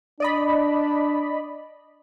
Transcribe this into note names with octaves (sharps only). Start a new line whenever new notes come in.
D4 D5 D#5 B5